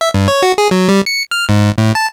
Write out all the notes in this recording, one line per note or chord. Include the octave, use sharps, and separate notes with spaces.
E5
G2
C#5
F#4
G#4
F#3
G3
C#7
F6
G#2
A2
A5